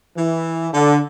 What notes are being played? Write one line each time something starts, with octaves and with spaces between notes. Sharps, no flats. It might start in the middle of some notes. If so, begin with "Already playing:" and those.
E3
D3